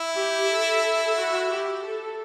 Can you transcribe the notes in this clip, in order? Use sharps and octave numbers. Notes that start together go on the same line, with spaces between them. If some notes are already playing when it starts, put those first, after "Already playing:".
Already playing: E4
G4
A4
F#4
G4
A4